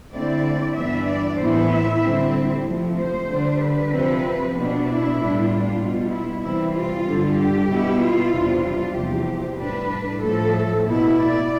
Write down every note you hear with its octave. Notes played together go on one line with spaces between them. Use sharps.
D3 A3 C4 E4 D5
G2 E3 B3 D4 E5
D5
A2 E3 B3 E4 C5
E5
D3 G3 C4 E4
C3 F3 A3
C5
D3 G3 D4
B4
C3 F3 C4
B2 B3 D4
E4
A2 G3 B3 D4
F4
B2 G3 B3
E4
C3 E3 G3 C4 E4
F4
G2 D3 G3
G4
B2 B3 E4
F4
E2 C3 G3 D4
F4
E2 C3 F3 G4
A2 G3 D4 B4
A2 F3 A3 A4
B2 B3 E4
D5